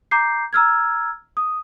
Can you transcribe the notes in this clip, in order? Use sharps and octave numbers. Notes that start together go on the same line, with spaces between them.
A#5 D6 G6 C7
A#5 E6 F6 G#6
D#6